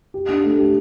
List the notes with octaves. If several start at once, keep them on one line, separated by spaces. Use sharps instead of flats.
G4
D4
A3
G4